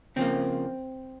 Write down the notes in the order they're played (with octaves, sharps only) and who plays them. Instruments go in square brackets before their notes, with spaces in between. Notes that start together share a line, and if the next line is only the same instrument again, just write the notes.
[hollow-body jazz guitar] C#3 F3 A#3 C4